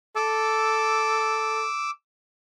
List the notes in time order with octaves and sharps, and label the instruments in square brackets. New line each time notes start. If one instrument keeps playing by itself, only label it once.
[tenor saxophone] A4 [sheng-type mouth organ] D6 E6